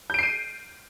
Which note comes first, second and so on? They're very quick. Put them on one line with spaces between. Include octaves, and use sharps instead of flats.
G6 D7 C7 D#7